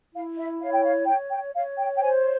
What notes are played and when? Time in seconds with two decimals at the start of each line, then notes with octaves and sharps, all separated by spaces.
0.14 E4 F5
0.37 E5
0.61 C#5 F5
0.73 G5
0.84 F5
1.07 C#5 G5
1.31 G5
1.55 C#5 F5
1.78 G5
1.95 G5
2.01 C5 G#5